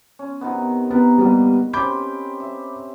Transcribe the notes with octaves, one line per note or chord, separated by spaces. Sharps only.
C#4
C3 D#3 B3
B3 A#4
G3 A#3 B3 B4 D#5 C#6
C4 C#4 G4 B5 D6 G6
E5